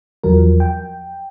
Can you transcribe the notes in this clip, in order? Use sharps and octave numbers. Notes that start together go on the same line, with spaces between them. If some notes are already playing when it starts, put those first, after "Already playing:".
E2 F3 F#3 A#4
G5